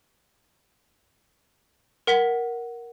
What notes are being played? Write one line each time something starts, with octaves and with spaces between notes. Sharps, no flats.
A#4 F#5 B6 G7